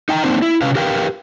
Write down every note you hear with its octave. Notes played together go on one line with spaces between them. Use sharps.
D#4 G5 A5 A#5
A#3 C4 D4 D#4 C5
E4
C3 C#4 B4 F5
G4 A#4 B4 F5 G5